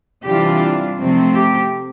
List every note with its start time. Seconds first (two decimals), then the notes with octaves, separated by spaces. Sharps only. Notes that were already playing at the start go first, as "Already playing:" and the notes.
0.25 C3 E3 G3 D4 F4 G4
0.98 C3 F3 A3 C4
1.34 G4